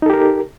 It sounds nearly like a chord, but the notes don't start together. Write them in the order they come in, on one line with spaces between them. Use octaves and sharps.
D#4 A4 G4 A#4